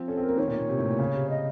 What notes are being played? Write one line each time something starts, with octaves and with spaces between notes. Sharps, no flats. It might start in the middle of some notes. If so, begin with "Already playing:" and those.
Already playing: F3 C4
C#4 A4
C4
A#3 A#4
D#3 C#5
A#2
A#2
C3
A2
A#2
C#3
C3
D#5